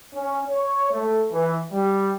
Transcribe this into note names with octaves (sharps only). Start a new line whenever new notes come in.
C#4
C#5
A3
E3
G3